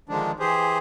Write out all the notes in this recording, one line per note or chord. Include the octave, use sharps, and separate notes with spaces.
D3 D#3 F3 G#3 D4
E3 G4 G#4 C5